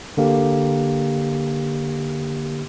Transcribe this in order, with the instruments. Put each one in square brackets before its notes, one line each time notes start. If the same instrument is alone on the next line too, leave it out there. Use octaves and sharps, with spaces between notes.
[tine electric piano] D3 A#3 G4